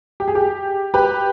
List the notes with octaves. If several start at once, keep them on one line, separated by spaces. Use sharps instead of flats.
G4
G#4
G4
G4 B4